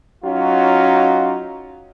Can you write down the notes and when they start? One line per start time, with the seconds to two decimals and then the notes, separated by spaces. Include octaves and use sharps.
0.25 F#3 C#4 D#4 F4 F#4